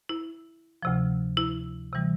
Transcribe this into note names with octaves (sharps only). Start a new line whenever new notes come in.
E4
D2 C3 F3
E4
C3 E3 G3